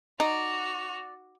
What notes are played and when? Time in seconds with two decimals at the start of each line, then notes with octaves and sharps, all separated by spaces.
0.20 D#4 F#4 D5 F7